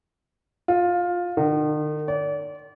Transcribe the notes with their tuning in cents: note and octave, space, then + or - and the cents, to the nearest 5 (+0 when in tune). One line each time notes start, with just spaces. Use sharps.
F4 +15
D#3 -45
D5 -35